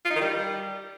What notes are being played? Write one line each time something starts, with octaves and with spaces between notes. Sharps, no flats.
F4
D#4
D#3
G3